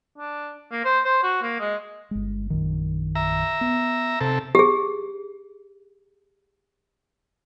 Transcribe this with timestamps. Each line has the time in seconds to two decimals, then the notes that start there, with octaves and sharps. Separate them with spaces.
0.18 D4
0.72 A#3
0.85 C5
1.05 C5
1.23 F#4
1.43 A#3
1.60 G#3
2.11 G1 G#3
2.50 A#1 F#2 D#3
3.16 E5 A#5
3.61 B3
4.21 C3 A4
4.55 G4 G#4